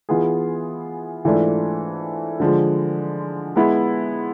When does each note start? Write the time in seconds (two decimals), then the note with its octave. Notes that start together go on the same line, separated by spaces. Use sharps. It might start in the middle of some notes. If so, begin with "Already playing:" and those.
0.09 E3 B3 F4 G#4
1.25 G#2 E3 A3 D4 F4
2.40 D3 F3 G#3
3.56 G#3 B3 E4